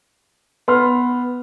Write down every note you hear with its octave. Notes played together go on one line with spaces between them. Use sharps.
B3 C6 F6